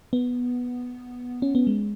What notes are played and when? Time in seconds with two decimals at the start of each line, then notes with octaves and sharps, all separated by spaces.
0.13 B3
1.42 C#4
1.55 B3
1.67 G#3